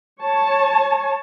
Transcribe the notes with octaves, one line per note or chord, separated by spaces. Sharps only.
C#5 A5